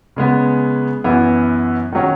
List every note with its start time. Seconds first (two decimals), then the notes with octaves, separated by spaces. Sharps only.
0.16 C#3 G#3 B3
1.04 F#2 E3 B3 E4
1.92 D#3 F#3 C#4